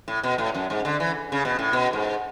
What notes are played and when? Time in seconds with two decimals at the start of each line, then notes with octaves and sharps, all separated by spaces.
0.08 A2
0.23 B2
0.38 A2
0.55 F#2
0.70 G#2
0.85 D3
1.00 E3
1.32 C#3
1.45 B2
1.59 A2
1.73 B2
1.93 G#2